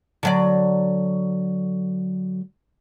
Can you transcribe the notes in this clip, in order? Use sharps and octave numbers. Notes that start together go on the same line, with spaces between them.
D3 F#3 D5